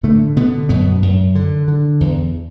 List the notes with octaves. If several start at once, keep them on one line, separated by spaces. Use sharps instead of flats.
A2 D3 A3
B2 D3 B3
F#2 B2 B3
F#2
D3
D3
E2